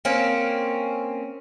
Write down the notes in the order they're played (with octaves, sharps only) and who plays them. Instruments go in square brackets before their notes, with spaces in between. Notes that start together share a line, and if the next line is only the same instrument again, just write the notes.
[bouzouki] A#3 C4 C#4